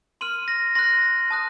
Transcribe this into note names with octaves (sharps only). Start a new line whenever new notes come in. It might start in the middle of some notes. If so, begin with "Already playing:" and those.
C6 F6 D#7 F#7
A#6
C6 F#6 A#6
A5 D#6 F#6